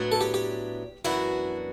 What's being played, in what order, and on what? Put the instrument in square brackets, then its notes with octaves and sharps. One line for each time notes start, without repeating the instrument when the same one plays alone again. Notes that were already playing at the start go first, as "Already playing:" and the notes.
Already playing: [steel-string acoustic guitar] A2 F#3 B3 D4
[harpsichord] A4
G4
G4
[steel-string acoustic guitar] F#2 E3 B3 D4 F#4 [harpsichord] E4